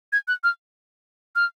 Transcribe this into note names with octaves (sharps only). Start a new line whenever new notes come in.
G#6
F#6
F6
F6